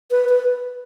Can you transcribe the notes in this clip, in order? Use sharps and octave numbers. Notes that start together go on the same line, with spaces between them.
B4
B4